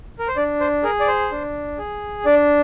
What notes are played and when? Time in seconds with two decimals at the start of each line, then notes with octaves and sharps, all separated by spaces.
0.19 A#4
0.28 C5
0.36 D4 D5
0.60 C5
0.83 G#4 A#4
1.00 D5
1.08 C5
1.31 D4
1.78 G#4
2.25 D4 D5